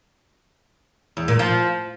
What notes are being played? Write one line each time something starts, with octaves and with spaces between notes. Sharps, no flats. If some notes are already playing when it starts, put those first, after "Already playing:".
E2
A#2
F3